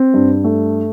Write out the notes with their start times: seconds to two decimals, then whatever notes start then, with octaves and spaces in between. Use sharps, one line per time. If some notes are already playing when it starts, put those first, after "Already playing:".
Already playing: C4
0.14 G2
0.44 A3